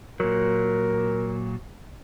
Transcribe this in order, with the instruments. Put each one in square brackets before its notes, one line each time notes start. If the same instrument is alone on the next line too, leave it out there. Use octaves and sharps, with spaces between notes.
[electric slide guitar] A#2 F#3 [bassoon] A#4